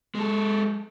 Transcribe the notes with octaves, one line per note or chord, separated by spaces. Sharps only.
G#3 A4